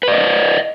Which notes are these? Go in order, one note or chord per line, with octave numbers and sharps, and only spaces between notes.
B4 D5 D#5